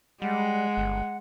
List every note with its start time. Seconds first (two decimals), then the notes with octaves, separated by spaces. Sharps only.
0.22 G3 G#3 F#5
0.77 G1